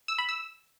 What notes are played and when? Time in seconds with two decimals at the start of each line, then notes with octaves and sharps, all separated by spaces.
0.08 E6
0.18 B5
0.29 E6